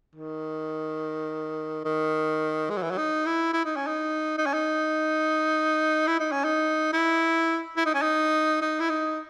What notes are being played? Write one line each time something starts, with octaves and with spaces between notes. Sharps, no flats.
D#3
D#3
G#3
F#3
E3
F#3
D#4
E4
E4
D#4
C#4
D#4
D#4
C#4
D#4
E4
D#4
C#4
D#4
E4
E4
D#4
C#4
D#4
D#4
E4
D#4